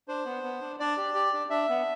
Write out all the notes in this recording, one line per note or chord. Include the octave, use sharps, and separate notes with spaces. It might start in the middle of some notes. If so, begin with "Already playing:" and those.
D4 C5
B3
B3
D4
D4 D5
G4
G4
D4
D4 E5
B3